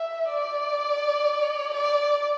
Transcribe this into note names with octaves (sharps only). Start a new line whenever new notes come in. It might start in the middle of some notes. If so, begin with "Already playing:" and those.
Already playing: E5
D5
D5